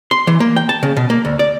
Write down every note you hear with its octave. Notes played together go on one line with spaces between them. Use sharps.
C6
E3
A#3
G5
A5
C#3
B2
A#3
D2
D5